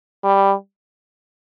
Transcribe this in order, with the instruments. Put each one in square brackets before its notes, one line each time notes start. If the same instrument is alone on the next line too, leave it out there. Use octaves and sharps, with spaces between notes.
[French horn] G3